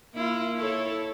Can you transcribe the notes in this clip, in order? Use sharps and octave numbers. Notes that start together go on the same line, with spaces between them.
A#3 E4 F4
E4 A4 C#5